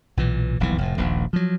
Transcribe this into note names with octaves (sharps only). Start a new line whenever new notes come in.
B1 A#2 E3
D#1 B1 F2 E3
F1 A2
D#1 A#1 D#2
F3 F#3